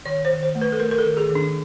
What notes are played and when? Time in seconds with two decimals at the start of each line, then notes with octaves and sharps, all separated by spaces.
0.06 D#3 C#5
0.25 C5
0.30 D#3
0.43 C5
0.55 A3
0.61 B4
0.72 A4
0.80 A3 A#4
0.91 A#4
0.98 A4
1.05 D#3
1.17 G#4
1.29 D#3
1.35 D4